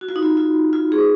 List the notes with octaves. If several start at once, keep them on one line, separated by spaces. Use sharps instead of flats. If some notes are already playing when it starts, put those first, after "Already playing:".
F#4
F4
D#4
F4
F4
F4
G#4